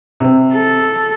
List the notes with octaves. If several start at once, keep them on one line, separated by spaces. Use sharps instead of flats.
C3 C4
A4